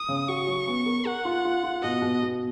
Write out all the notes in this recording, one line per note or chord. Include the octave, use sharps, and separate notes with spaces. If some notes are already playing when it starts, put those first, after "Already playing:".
Already playing: D#6
C#3
F#4 C#6
F#3
B3
A#4
A#4 F#5
F4
F4
F4
B2 D#5
B2
B2